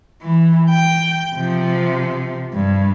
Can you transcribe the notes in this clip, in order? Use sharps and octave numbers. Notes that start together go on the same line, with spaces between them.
E3
G5
C3 F3
G2